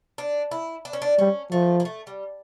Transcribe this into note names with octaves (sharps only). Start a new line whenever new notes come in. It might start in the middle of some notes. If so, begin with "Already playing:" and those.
D4
E4
D4
C#4
D4
G3 C#4
F3 A3
A#3
A3
G3